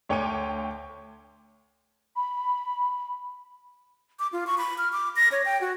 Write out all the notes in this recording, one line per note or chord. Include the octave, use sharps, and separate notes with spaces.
D2 C#5 G5 D6 C#7 D#7
B5
D6
F4
C#6
B5
F6
D6
A#6
C#5
G5
F#4